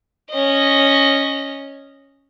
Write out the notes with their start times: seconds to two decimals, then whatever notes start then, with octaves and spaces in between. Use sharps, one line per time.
0.30 C#4 D#5